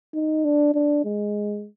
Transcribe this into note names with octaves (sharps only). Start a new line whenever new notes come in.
D#4
D4
D4
G#3